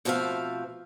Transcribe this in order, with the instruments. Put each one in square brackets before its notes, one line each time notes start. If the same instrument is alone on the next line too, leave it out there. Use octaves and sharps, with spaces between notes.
[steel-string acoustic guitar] B2 F3 A3 C4 E5 F5